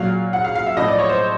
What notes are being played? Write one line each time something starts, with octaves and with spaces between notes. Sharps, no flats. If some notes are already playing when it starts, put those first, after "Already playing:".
Already playing: A#2 F#3 F5
F#5
F5
F5
E5
A2 F3 D#5
D5
C#5
C5